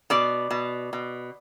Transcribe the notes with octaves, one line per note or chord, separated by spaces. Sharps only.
B2 D5
B2
B2